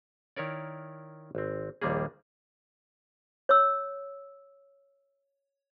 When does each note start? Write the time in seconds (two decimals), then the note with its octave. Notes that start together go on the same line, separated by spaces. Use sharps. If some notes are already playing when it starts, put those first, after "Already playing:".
0.36 D#3 E4 A#4 C#5 D5
1.35 G#1 C4
1.81 A#1 D#2 D#3 G3 A#3 G#4
3.49 C#5 E6